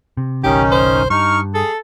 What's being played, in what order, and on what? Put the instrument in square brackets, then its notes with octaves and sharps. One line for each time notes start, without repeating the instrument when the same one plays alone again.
[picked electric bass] C3
[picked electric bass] F#1 B1 [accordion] D#3 C#4 D#4 [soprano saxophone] G4
[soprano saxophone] C5
[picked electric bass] G2 [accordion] D#4 F6 [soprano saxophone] C#6
[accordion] G#4 [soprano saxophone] A4